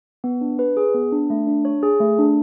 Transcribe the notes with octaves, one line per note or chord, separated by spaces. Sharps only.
B3
D4
B4
G#4
B3
D4
A3
D4
C#5
G#4
A3
D4